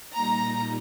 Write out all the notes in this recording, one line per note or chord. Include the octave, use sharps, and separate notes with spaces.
A#2 G3 A#3 D#4 A#5